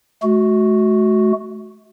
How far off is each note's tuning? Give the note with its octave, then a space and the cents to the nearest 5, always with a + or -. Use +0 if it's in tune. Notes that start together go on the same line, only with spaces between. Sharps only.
A3 -40 F#4 +0